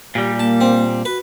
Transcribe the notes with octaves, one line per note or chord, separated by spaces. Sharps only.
A#2 G3 G4
A#3 A5
C4
F#4 B4